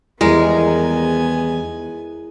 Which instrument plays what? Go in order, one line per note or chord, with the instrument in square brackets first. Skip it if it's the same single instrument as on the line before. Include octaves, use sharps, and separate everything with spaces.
[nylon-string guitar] E2 D#3 G3 [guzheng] G#3 A#4 [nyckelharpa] B3 G#5 [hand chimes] E4